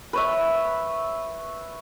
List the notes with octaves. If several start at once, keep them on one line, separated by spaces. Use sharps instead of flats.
B4 C#5 E5